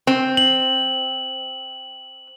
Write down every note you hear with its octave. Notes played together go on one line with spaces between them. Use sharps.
C4
F#7